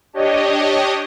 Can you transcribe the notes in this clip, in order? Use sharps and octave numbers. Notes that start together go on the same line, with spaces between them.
D4 G4 C#5 D#5